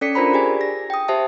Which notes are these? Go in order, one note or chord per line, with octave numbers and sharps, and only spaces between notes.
C#4 A4 D5 B6 C#7
D4 F4 A#4 C5 A#5 B5
G4 G#4 D5 G#5
A#6
G5 D#6
G4 C5 E5 A5 D#6